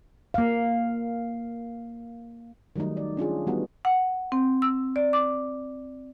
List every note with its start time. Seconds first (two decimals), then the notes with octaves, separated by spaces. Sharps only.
0.34 A#3 F5
2.76 D#3 F#3 G3 A3 D#4
2.97 D5
3.17 C#4 D4 F4 G#4
3.47 E3 G3 B3 D#4 F#4
3.85 F#5
4.32 C4
4.62 E6
4.96 D5
5.13 D6